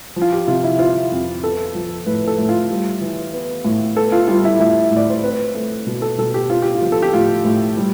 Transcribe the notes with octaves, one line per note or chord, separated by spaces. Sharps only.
F3
F4
G4
C3 F4
E4
C4 F4
F2
B3 A4
F3
A2 B4
A4
A2
F4
G3
E3
B3
A2
B3 A4
F4
G3 F4
E4
A2 E4
A2
D5
C5
C4 B4
A3
B2
A4
B2 A4
G4
C4 F4
G4
F4
F3
A4
G4
A2 F4
A2
G3